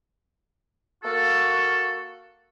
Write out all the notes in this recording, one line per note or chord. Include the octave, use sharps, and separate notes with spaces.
A#3 F#4 A4